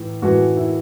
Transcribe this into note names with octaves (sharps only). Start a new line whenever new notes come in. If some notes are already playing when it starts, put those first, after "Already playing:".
Already playing: A2 E3
A2 E3 F#4
E4